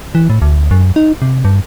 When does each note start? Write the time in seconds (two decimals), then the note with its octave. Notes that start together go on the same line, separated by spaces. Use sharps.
0.15 E3
0.30 A2
0.42 D2
0.71 F#2
0.96 D#4
1.22 C3
1.45 G2